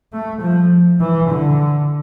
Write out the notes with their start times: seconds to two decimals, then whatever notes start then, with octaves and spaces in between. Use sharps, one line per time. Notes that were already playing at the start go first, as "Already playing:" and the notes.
0.13 A3
0.41 F3
1.00 E3
1.29 D3